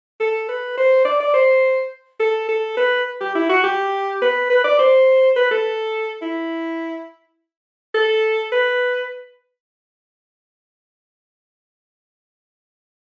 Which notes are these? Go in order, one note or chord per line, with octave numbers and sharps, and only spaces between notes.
A4
B4
C5
D5
D5
C5
A4
A4
B4
G4
E4
F#4
G4
B4
B4
D5
C5
B4
A4
E4
A4
B4